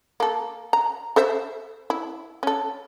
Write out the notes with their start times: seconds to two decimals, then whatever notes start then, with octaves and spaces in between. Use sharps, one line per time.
0.20 A#3 A4
0.73 A#5
1.16 A4 C5 E5
1.90 E4
2.43 C#4 A4